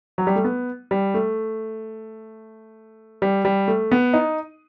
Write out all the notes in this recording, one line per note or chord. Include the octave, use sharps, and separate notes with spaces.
F#3
G3
A3
B3
G3
A3
G3
G3
A3
B3
D#4